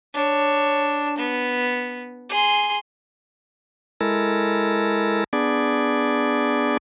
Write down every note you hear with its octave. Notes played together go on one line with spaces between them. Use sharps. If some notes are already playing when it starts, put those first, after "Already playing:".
D4 C#5
B3
G#4 C6
G#3 E4 A4 A#4
B3 D4 G#4 D5